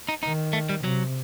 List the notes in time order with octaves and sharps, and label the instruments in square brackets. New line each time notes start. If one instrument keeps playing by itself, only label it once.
[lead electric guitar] D#4
[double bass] D#3 [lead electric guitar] D#4
[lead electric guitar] A3
G3
[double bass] C3 [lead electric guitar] F#3